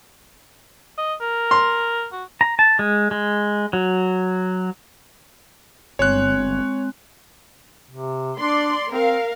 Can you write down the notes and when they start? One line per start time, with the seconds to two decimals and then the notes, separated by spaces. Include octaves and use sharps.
0.98 D#5
1.21 A#4
1.51 C6
2.13 F#4
2.41 A#5
2.59 A5
2.79 G#3
3.11 G#3
3.73 F#3
5.99 G1 G#3 C4 C#5 F#6
7.91 C3
8.40 D4 D5 C6
8.91 C4 A#4 F5